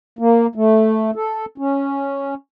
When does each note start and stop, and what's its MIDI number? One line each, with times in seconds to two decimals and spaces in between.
0.19 0.47 58
0.55 1.11 57
1.16 1.45 69
1.58 2.34 61